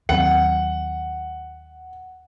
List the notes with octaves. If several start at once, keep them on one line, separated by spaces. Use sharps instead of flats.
D#2 F#3 C4 F#5